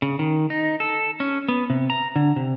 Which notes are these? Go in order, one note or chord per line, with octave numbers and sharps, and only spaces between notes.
C#3
D#3
D#4
A4
C#4
B3
C3
A#5
D3
C3